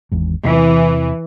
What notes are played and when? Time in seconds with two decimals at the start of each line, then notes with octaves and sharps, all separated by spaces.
0.12 G#1 E2 G#2
0.45 E2 C3 E3